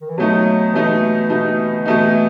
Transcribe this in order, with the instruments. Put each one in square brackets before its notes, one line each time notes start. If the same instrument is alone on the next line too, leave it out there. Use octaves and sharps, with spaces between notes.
[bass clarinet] D#3
E3
[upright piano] B2 A3 D#4 [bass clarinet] F#3
[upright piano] B2 A3 D#4 [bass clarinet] E3
[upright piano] B2 A3 D#4
[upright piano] B2 A3 D#4 [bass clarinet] E3